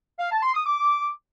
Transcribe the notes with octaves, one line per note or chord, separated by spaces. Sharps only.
F5
A5
C6
D#6
D6